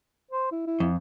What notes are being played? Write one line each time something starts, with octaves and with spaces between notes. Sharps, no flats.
C5
E4
E4
F2